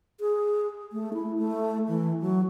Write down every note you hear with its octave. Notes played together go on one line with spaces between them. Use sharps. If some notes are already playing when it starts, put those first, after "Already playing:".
G#4
A3
E4
A3
E3
F#3